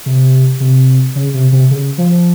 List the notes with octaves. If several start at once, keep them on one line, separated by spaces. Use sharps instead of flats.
C3
C3
C#3
C3
C3
C#3
F3